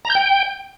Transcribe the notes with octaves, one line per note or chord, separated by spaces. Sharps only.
A#5
G6
G5